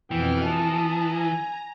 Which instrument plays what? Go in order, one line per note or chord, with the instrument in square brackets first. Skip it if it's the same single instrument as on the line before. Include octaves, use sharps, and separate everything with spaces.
[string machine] F2 B2 F6 [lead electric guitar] E3 [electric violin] B3 G5
[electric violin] A5 D#6 [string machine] A#5
[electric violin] G#5